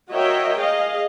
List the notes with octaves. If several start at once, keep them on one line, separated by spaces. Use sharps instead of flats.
F#4 A#4 C#5 D#5 E5 G5
G#4 D#5 F5